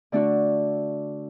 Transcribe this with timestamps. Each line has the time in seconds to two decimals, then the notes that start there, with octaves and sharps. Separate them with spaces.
0.12 D3 A3 D4 F#4